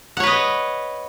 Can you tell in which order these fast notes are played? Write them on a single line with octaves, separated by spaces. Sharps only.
F#5 C#5 B4 D#5